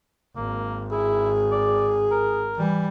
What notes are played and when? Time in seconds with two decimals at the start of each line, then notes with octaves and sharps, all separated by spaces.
0.36 G#1 A#3
0.92 E4 G#4
1.52 D5
2.11 A#4
2.58 E3 G3